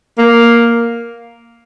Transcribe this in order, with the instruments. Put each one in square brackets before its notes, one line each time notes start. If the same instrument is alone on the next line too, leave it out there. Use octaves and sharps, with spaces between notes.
[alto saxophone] A#3